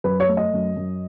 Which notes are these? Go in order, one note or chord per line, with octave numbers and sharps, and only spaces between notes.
F#2 B4
C#5
A3
D#5
F#2
F#2